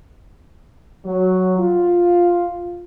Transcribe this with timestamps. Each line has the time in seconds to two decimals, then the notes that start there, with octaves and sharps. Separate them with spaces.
1.04 F#3
1.57 F4